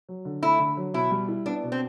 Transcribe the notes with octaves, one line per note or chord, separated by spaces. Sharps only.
F#3
D3
A3 E4
D3
F#3
B2 E4
G3
E4
B3 D4
B2
C4